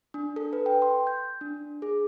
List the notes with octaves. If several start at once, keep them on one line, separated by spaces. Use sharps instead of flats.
D4
A4
B4
G5
C6
G6
D4
G#4